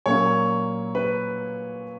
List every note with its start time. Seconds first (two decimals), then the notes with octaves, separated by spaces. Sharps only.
0.06 A#2 F#3 A#3 C#4 C#5
0.95 B4